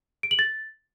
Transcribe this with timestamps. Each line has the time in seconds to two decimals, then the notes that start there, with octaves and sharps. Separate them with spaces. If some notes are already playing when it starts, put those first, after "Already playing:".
0.23 D7
0.31 F#7
0.39 A6